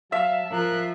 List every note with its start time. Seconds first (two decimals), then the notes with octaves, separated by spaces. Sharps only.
0.12 F#3 E5 F5 A5
0.52 F3 A#4 F#6